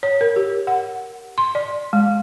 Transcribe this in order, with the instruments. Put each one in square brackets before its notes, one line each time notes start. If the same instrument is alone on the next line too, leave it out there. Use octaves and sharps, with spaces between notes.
[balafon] C#5
A#4
G4
F#5
C6
D5
G#3